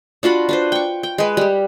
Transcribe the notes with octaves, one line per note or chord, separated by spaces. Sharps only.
D4 F4 F#4 B5
D4 B4 C5
G5 C#6
G5
G#3 B4
G3 G4